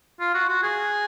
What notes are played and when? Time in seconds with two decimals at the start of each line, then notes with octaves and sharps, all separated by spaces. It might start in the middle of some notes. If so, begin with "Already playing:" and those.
0.21 F4
0.34 F#4
0.49 F#4
0.63 G#4